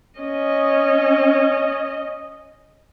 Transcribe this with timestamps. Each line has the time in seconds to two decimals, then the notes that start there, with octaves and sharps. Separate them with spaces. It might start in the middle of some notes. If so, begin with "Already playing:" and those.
0.20 C#4 D#5